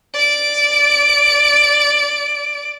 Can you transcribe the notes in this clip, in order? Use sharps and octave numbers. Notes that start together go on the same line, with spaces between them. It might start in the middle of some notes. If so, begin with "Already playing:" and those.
D5 D7